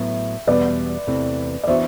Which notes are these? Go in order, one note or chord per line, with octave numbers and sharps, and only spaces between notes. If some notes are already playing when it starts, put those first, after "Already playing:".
Already playing: A2 F#3 B3 E5
E2 B2 G3 B3 B4 D5
E2 C3 E3 A3 C4
D5
E3 B3 D4 F#4 C5 E5